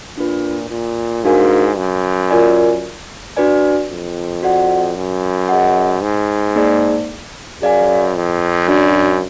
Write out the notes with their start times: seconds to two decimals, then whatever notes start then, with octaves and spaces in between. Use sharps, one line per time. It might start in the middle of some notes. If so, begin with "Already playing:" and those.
0.17 A#2 D4 F4 B4
0.70 A#2
1.24 G#2 D4 F#4 A#4 F5 G#5
1.77 F#2
2.30 F4 A#4 D5 G#5
3.37 D4 F#4 B4 D5 G#5
3.89 F2
4.43 F#4 D5 F#5
4.96 F#2
5.49 G#4 D#5 F#5
6.02 G#2
6.56 A#3 D#4 G#4 D5
7.61 F#2 G#4 D5 F5 G#5
8.15 F2
8.68 F#2 D4 F#4 D5